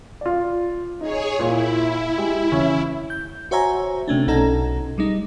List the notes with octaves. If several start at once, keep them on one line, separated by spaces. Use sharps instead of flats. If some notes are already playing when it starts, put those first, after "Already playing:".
F4 D5
D#4 G#4 C#5
A#2 E4
G#3 G4
E2 C#3 C#4
G6
F#4 C5 C#5 E5 G#5 A#5
C3 A3 C#4 D4
B1 B2 C#4 D#4 A4 A#5
G3 G#3 D#4